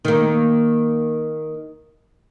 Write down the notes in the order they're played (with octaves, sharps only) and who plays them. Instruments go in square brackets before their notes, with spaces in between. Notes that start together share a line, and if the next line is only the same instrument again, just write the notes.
[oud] D#3 A#3